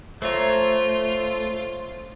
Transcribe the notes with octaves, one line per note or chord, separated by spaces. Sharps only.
A3 F4 C5 C#5 A#5